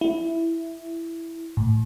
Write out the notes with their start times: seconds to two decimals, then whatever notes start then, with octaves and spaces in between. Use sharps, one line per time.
0.01 E4
1.57 A2